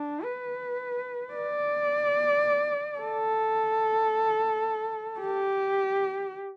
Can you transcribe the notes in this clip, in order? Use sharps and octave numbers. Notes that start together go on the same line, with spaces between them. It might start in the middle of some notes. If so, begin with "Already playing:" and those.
Already playing: D4
B4
D5
A4
G4